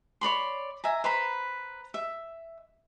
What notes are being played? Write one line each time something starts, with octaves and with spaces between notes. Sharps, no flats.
C#5 D5 B5 C6
E5 G#5 A#5
B4 C5 A#5 B5
E5